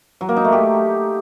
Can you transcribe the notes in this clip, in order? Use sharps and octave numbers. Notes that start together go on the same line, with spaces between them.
F#3
A#3
D#4
A3
G4